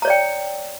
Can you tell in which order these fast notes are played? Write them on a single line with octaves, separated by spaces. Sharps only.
A#5 C#5 D5 G5